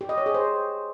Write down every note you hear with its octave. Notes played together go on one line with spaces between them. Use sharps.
G4
D#5
C#5
G#4
C5